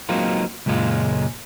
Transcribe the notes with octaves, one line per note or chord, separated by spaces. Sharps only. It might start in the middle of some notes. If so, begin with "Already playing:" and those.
F#3 G#3 A#3 C4 D#4 F4
C#2 F#2 A#2 G#3 F4